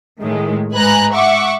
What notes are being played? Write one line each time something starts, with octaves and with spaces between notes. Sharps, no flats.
A2 D#3 G#3
G#2 B4 G#5 A#5 F#6
E5 F#5 C#6 D6